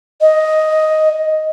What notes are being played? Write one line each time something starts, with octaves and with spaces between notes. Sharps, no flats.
D#5